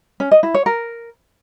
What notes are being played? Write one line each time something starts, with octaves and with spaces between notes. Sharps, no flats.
C#4
D#5
E4
C#5
A#4